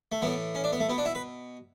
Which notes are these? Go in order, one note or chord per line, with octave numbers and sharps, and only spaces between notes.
A3
A2 E3 B3
C#4
D4
B3
A3
B2 B3
D4
E4
B4